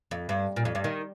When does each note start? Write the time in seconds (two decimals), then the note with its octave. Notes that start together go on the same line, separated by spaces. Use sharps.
0.11 F2
0.29 G2
0.56 A#2
0.65 F2
0.75 G2
0.84 D#3